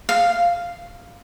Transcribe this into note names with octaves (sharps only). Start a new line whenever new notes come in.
F5